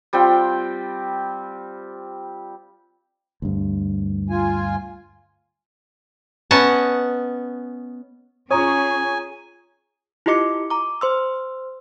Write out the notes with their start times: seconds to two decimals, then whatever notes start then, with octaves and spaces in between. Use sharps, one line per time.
0.13 G3 C4 F4 G5
3.42 D2 G2
4.30 F4 G#5
6.51 B3 C#4 D#5 F#5 A5
8.51 C#4 F4 G#4 C#5 G#5 A#5 C#6 D#6
10.26 E4 F4 G4 D#5 D6 C#7
10.70 A#5 D6
11.01 C5 C6 E6